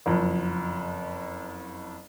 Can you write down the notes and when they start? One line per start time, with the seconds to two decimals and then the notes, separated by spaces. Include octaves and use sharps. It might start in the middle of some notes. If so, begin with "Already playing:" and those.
0.06 F#1 F2